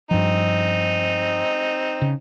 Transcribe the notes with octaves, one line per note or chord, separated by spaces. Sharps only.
G2 F3 C4 D#4
C#3